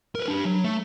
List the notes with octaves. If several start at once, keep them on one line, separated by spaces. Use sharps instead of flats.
A#4 B4
D4 G4
F#3
A3